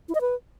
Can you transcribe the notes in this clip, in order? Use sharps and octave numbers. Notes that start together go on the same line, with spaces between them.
E4
D#5
B4